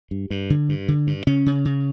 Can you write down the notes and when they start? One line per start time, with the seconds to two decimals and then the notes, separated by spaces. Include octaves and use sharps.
0.11 G2
0.30 G2
0.50 D3
0.69 G2
0.88 D3
1.07 G2
1.27 C#3 C#4
1.46 C#3
1.65 C#3